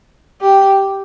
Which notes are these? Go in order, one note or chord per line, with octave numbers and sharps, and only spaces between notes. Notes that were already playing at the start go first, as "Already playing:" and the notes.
G4